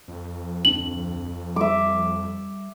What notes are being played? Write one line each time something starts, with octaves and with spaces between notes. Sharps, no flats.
F2
D1 C4 D4 F#7
G3 E5 D6